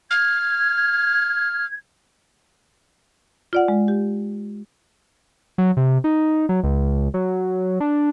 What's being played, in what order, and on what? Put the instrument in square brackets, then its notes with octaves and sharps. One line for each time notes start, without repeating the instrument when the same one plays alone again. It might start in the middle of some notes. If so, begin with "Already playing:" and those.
[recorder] F6 [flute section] G#6
[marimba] F4 D5 F#5
G#3
G4
[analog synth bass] F#3
C3
D#4
F#3
C#2
F#3
D4